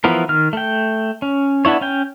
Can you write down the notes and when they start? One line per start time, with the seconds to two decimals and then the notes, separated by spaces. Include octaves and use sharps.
0.04 E3 F3 B3 E4 A#4
0.29 D#3 F6
0.53 A3 G5
1.22 C#4
1.65 B3 D4 E4 C#5
1.81 C#4 G5